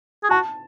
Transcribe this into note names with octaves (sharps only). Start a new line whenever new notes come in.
G#4
F#4 A5